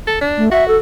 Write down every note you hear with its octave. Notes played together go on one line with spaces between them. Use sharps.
A4
D4
A3
F#4 E5
A4